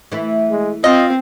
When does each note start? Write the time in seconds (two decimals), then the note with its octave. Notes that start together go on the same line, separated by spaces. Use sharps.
0.12 E3 A3 E4
0.51 G#3
0.84 C4 F4 D#5